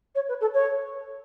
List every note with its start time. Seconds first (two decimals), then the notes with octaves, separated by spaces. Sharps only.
0.15 C#5
0.28 B4
0.40 A4
0.54 C#5